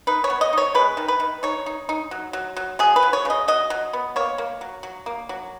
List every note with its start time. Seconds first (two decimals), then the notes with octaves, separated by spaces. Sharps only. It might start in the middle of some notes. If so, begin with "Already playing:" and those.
0.07 D#4 B4
0.24 C#5
0.30 B3
0.41 D#5
0.53 D#4 C#5
0.74 G#3 B4
0.97 D#3
1.08 B4
1.20 D#3
1.43 D#4 C#5
1.66 D#4
1.89 D#4
2.11 F#3
2.33 F#3
2.56 F#3
2.79 F#3 G#4
2.96 B4
3.03 F#3
3.13 C#5
3.25 C#3 D#5
3.48 F#3 D#5
3.70 F#3
3.93 B3
4.16 A#3 C#5
4.38 A#3
4.61 F#3
4.83 F#3
5.06 A#3
5.29 F#3